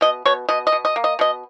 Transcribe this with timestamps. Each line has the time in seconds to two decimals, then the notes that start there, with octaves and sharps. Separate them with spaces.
0.01 B2 D#5
0.25 B2 C#5
0.49 B2 D#5
0.67 D#5
0.72 B2
0.85 D#5
0.96 A#3
1.04 D#5
1.19 B2 D#5